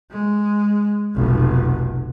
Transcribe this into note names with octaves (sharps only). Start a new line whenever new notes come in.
G#3
F1 B1